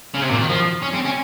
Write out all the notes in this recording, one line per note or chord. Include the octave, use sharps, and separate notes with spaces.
C#3
C3
A#2
D#3
F3
C#4
C4
C#4